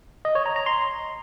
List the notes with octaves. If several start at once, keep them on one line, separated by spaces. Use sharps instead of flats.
D#5
C#5
A#5
A#5
C6